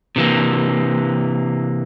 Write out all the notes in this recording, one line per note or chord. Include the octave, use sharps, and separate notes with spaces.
C3 E3 A#3